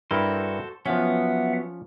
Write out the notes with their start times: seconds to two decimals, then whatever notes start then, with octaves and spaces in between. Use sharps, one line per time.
0.11 G2 E4 F#4 A4 A#4 C5
0.86 F3 F#3 B3 C#4 E5 F#5